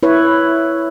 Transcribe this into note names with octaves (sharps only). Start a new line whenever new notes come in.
E4 B4 C#5